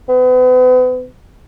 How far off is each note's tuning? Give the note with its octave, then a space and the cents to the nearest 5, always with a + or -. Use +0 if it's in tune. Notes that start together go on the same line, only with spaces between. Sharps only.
B3 +40